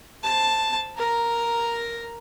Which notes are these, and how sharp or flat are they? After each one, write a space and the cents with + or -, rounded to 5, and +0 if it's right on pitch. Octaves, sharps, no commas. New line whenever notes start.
C5 +0 A5 +0
A#4 +0 A#5 +0